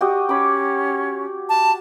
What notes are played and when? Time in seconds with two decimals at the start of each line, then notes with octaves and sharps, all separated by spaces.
0.01 F#4 G4 D#5
0.29 C#4 B5 D6
1.49 A5